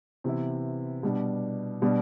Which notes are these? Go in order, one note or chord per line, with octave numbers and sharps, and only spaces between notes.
C3 E3 B3 E4
B2 G3 D4
B2 G3 D4